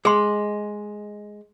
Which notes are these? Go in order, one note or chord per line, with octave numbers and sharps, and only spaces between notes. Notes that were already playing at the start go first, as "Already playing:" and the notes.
G#3 G#4 C6